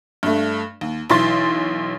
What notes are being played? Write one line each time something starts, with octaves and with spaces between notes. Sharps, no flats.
G2 A3
D#2
B1 E3 C6 A6